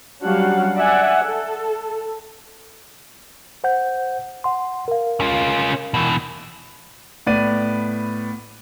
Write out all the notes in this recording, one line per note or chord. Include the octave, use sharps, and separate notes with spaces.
F#3 G3 C#4 D4 F5 F#5
D5 E5 F#5 G#5
A4
C5 F#5 G6
F#5 C6
A#4 F5
C#4 F4
B2 E3
A2 B3 D5 D#7